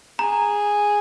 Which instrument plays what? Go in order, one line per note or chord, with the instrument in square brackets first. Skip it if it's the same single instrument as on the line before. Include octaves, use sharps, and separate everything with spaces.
[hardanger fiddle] G#4 [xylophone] A#5